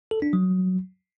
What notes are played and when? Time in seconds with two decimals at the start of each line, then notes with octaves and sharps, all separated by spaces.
0.11 A4
0.22 D4
0.33 F#3